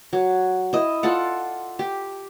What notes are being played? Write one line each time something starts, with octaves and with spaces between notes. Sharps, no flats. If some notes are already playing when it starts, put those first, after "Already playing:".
F#3
E4 D#5
F4 A4 D5 F#5
G4